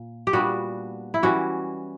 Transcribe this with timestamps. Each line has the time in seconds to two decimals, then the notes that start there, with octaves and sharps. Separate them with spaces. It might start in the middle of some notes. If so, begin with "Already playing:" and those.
Already playing: A#2
0.27 G4
0.33 A#2 G3 B3 D4 F#4
1.14 E4
1.23 E3 G3 C#4 F#4